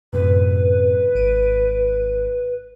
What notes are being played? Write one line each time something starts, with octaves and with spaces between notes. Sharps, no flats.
F#2 A2 C3 B4
G#1 D7 D#7